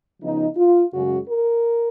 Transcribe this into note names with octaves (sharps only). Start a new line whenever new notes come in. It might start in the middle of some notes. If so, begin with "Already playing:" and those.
C#3 F3 B3 D#4
F4
F#2 C#3 G#3 C#4 F#4
A#4